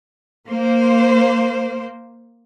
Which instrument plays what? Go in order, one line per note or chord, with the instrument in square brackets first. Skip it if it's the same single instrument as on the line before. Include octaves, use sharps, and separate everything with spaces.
[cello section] A#3 C5